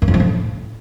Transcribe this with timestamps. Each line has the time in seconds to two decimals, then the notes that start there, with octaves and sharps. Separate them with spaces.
0.02 F#2
0.08 F2
0.14 F3
0.20 A2